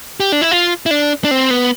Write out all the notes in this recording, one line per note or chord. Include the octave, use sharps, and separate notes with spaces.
G4
D4
E4
F4
E4
D4
D4
C4
B3